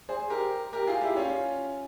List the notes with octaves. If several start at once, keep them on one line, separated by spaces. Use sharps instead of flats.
G#4 C5
G4 A#4
G4 A#4
F4 G#4
E4 G4
C#4 F4